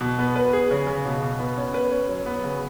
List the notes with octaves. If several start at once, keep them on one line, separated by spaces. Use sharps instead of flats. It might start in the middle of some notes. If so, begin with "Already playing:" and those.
B2
B3
B4
G#4
C#3
C#3
B2
B2
B3
C#4
B4
C#4
F#3
B3
C#3